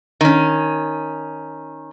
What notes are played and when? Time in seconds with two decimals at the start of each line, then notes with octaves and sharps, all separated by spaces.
0.21 D#3 C#4